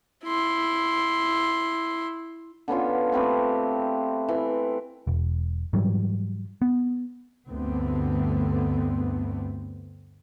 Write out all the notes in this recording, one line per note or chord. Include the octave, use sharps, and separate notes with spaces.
E4 C6
D3 B3 C#4 F4
A3 C4 G4 B4
E3
E1
G#2 E3 F#3 G3
B3
D2 G2 D3 A3 B3 C4